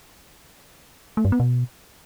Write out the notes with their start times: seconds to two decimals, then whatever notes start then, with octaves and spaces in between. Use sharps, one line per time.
1.17 A3
1.25 G2
1.32 B3
1.40 B2